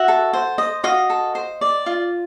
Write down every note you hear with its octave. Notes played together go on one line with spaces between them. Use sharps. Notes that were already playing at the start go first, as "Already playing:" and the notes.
Already playing: F#4 E5 F#5
A4
C5
D#5
F#4 D#5 F5
A4
C5
D5
F4